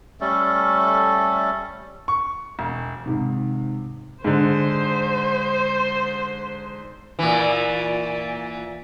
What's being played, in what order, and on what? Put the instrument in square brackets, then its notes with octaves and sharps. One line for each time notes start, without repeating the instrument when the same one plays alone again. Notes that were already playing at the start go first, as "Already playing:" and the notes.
[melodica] G3 A3 C#4 A4
[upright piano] C#6
E1
[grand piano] G#2 C3 D#3
[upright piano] G#2 D3 [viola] C5
[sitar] A#2 E3